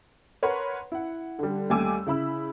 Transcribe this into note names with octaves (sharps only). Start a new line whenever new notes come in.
A#4 B4 C#5 F#5 C6
E4 F#5
D3 G3
D#2 G3 A3 G#5 D6 E6
C#3 E4 B5 E6